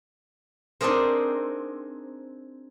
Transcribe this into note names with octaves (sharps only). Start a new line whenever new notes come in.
C4 D4 D#4 G#4 A#4 C5